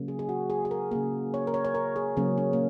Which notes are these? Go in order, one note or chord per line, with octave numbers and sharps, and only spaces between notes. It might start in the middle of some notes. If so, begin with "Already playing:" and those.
Already playing: C#3 F#3 A#3
G#4
G#4
F#4
G#4
G#4
A#4
C#3 A#3 G#4
C#5
A#4
C#5
C#5
A#4
G#4
C#3 F#3 A#3 C#4
C#4
A#3